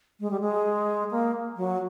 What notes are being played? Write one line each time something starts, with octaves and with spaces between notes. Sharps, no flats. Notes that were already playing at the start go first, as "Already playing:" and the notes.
G#3
G3
G#3
A#3
F#3